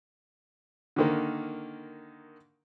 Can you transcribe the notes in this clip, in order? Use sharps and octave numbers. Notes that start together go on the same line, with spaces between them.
D3 D#3 A#3